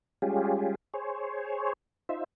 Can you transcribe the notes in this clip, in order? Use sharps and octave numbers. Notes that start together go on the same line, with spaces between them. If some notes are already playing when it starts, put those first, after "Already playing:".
G3 G#3 C#4 F4 G4 G#4
G#4 C5 C#5
D#4 F4 C5 E5